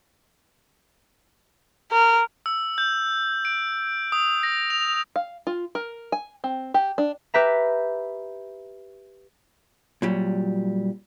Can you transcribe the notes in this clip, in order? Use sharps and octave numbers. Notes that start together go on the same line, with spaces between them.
A#4
E6
G6
D7
D#6
A#6
F7
F5
F4
A#4
G#5
C4
G4
D4
G4 B4 E5 A#5
A#2 F#3 G3